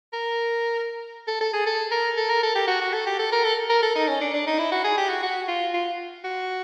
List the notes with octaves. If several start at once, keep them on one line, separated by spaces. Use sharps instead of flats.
A#4
A4
A4
G#4
A4
A#4
A4
A#4
A4
G4
F#4
F#4
A4
G4
A4
A#4
A4
A#4
A4
D#4
C#4
D4
D4
D#4
E4
F#4
G#4
G4
F#4
F#4
F4
F4
F#4